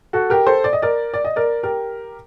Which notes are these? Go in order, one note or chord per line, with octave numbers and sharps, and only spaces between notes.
F#4 A4
G4 A#4
A4 C5
D5
D#5
A#4 D5
D5
D#5
A#4 D5
G4 A#4